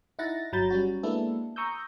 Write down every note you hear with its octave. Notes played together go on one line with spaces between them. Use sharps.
D#4 E4 F#5 A6 A#6
G1 F#3 A#5 B5 G6 A6
G3 C#4 F#4
G#3 A#3 B3 D4 E4 A4
A#5 C#6 D#6 E6 G6